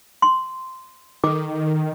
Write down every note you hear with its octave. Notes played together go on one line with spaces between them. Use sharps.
C6
D#3 A4 D6